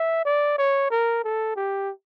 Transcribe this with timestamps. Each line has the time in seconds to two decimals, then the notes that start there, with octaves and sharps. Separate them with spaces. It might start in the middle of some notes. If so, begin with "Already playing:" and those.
Already playing: E5
0.25 D5
0.58 C#5
0.90 A#4
1.24 A4
1.56 G4